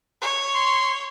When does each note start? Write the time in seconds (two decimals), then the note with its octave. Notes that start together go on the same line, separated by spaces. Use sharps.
0.22 C#5
0.54 C6